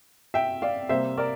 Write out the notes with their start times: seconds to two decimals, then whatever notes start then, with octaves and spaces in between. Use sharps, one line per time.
0.34 E5 G5
0.62 D5 F5
0.89 C3 G3 A#3 C5 E5
1.18 A#4 D5